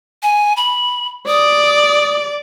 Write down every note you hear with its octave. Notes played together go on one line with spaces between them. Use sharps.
G#5
B5
D5 D#6